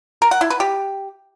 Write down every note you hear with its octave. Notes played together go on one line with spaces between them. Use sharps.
A#4
F#5
E4
B4
G4